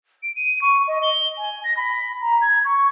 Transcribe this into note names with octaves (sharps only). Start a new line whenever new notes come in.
D7
D#7
C#6
D#5
G7
G#5
A#6
B5
A#5
G#6
C#6